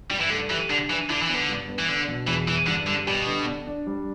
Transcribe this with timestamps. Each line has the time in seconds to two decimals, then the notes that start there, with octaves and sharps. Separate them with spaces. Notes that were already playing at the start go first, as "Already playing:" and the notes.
0.10 G2 G3
0.20 E3
0.30 D3 A3
0.50 E3 G4
0.69 D3 D4
0.89 E3 D4
1.09 D3 E4
1.22 E3
1.29 D3 B3
1.48 G2
1.69 B3
1.79 E3
1.88 D3 D4
2.08 B2
2.27 E2 E3
2.48 E2 E3
2.67 G2 D3
2.87 D3 G3
3.07 B2 G4
3.27 D3
3.46 D4
3.67 D4
3.87 G3